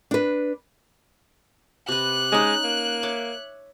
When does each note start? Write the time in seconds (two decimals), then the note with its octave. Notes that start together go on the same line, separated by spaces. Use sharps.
0.11 D4 B4
1.88 C3 B4 F#6
2.32 G#3 C#4 D#4
2.64 A#3
3.03 C#5 E5 D6